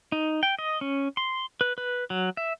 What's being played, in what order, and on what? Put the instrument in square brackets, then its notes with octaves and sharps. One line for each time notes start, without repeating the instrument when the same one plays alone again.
[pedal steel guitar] D#4
G5
D#5
C#4
C6
B4
B4
F#3
E5